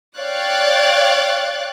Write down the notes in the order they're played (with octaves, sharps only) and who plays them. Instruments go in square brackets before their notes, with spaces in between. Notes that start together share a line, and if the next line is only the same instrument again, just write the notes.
[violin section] C#5 D5 F5 G5 F#6 A6